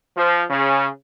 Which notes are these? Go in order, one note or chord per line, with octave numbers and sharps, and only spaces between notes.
F3
C#3